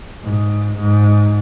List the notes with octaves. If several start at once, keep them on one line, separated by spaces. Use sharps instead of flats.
G#2
G#2